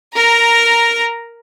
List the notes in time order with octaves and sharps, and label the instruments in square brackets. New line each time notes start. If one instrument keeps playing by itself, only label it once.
[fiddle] A#4 A#5